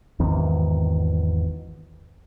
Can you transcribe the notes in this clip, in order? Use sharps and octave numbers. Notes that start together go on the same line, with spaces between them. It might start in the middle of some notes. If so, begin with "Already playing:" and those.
G#1 E2 D#3